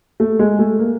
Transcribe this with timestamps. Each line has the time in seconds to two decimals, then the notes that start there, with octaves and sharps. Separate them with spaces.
0.20 A3
0.39 G#3
0.59 A3
0.79 A#3